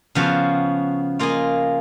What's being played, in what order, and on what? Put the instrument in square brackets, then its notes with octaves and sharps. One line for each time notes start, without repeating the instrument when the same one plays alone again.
[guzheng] C#3 F3 B3 F#4
A#3 F4 G#4 D#5